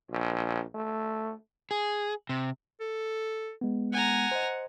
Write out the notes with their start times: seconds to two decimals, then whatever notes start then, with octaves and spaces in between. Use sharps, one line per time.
0.11 A#1
0.74 A3
1.71 G#4
2.29 C3
2.80 A4
3.61 G#3 B3
3.93 F#5 G#5 A#5
4.31 C5 D#5